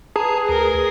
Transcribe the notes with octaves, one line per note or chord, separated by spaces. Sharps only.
G#4 B4 A5 A#5
D2 A#4